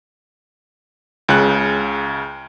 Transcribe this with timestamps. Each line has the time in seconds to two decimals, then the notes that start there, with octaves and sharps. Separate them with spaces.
1.29 C#2 C#3 F#6